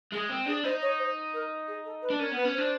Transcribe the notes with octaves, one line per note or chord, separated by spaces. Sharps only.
G#3 G#4
C4
D4 G#4
D#4 C5
C#5
C5
A#4
G#4
A4
B4
D4
C#4 A#4
B3 B4
C#4
D4 C5